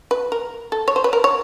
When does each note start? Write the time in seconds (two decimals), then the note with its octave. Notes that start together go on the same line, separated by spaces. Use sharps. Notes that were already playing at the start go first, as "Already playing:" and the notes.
0.11 B4
0.32 A#4
0.72 A4
0.88 C#5
0.96 C5
1.04 B4
1.13 A#4
1.24 C#5